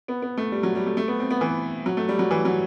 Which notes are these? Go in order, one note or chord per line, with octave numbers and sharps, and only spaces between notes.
B3
B3
A3
G3
F#3
G3
A3
A3
B3
C4
B3
E3
F#3
A3
G3
F#3
E3
F#3